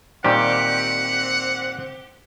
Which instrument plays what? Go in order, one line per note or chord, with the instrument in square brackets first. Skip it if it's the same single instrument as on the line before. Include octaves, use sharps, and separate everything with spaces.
[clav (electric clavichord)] A#2 D#3 G3 [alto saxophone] C4 [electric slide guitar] G4 [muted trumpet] F#5